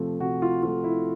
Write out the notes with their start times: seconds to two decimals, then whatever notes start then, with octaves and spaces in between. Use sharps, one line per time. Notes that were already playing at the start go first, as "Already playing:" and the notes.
Already playing: C3 F3 A3
0.20 C3 F#4
0.42 F4
0.63 F3 A3 F4
0.84 E4